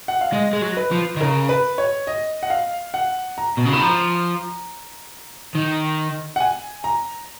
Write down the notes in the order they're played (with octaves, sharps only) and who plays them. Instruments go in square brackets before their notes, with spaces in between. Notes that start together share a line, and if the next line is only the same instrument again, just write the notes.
[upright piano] F#5
F5
[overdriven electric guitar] G#3 [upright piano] D#5
[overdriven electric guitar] G#3
F#3
[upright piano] B4
[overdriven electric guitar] F3
D#3
[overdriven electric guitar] C#3 [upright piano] A#4
[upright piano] B4
C#5
D#5
F#5
F5
F#5
A#5
[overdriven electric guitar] B2
C#3
[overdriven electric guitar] D#3 [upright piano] B5
[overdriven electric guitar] F3 [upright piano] A#5
[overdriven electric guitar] D#3
[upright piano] F#5
G#5
A#5